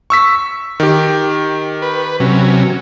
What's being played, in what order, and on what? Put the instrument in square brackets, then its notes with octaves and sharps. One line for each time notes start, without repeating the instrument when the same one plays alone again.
[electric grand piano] C#6 E6 B6
D#3 G4
[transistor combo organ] B4
C3 F#3 C#4